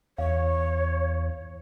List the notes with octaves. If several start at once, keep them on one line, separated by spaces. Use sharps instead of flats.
E2 C#5 F5